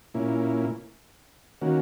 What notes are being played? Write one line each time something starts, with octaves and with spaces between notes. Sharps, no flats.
A#2 A#3 C#4 E4
D#3 A#3 C#4 F#4